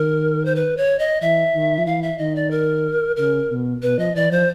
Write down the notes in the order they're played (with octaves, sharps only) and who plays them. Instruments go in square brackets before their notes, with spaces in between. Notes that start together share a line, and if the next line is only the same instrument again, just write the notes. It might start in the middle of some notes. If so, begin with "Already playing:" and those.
Already playing: [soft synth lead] D#3 [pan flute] A#4
[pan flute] C5
B4
C#5
D#5
[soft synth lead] E3 [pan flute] E5
[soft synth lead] D#3
F3
[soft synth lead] E3 [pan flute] F5
[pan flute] E5
[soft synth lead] D#3 [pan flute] D#5
[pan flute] D5
A#4
[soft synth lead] C#3 [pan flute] A#4
[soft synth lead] B2
[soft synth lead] B2 [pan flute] B4
[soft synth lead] F3 [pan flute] D#5
[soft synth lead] E3 [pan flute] D5
[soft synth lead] F3 [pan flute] C5